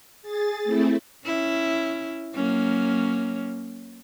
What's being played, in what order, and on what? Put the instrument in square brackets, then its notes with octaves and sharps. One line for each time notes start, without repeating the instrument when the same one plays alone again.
[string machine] G#4 A6
A3 C4 E4
[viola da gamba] C#4 E4
F#3 A#3 C#4